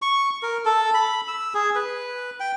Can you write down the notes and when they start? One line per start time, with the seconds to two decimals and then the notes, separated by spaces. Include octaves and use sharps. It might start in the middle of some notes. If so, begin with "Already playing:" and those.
0.02 C#6
0.43 A#4
0.65 A4
0.94 B5
1.28 E6
1.54 G#4
1.75 B4
2.40 G5